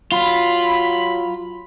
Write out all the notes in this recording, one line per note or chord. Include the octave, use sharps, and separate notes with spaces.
F#3 F4 B5